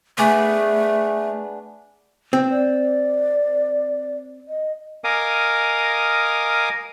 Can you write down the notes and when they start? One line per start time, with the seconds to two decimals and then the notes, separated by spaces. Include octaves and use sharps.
0.18 A3 B3 D4 G#4
2.33 C4
2.51 D5
4.48 D#5
5.04 A#4 D#5 F5 G#5 D6 D#6